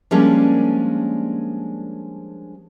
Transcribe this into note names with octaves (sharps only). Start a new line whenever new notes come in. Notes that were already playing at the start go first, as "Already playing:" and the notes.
F3 G3 G#3 A#3 C#4 D4